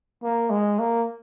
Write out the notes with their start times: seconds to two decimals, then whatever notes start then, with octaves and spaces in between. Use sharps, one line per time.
0.23 A#3
0.50 G#3
0.79 A#3